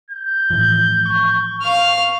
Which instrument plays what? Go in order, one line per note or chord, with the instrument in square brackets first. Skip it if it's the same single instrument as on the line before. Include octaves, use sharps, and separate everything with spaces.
[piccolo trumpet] G6
[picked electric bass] A2 E3 F3
[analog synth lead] C#6
[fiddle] F5 F6